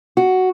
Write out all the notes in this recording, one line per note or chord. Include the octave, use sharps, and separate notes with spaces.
F#4